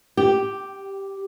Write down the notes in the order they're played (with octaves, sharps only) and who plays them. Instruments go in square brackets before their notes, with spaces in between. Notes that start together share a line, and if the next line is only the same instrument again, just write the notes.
[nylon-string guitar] G4